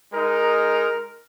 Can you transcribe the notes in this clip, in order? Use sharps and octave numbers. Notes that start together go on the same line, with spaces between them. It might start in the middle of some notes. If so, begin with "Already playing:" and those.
G#3 D#4 A#4